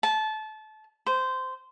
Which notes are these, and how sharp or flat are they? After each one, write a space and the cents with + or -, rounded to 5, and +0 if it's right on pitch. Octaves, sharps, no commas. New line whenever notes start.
A5 -25
C5 -15